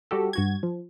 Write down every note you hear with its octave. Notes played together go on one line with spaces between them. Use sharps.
G3 F#4 G4 A4
G2 F#4 G#6
F3